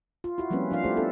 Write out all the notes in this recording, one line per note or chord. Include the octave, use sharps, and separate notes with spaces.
F4
E4 F#4
F3 G3 A#3 C4 C#4 B4
F3 D4 F4 F5
A3 E4 G4 C5
B3 D4 A4